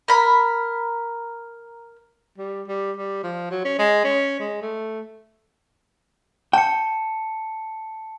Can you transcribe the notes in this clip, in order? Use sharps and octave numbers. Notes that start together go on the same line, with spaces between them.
A#4 B5
G3
G3
G3
F3
F#3
C#4
G#3
C#4
G#3
A3
G5 A5 C#7